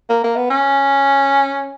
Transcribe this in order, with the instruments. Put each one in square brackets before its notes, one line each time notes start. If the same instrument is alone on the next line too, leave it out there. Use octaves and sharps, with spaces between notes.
[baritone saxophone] A#3
A#3
B3
C#4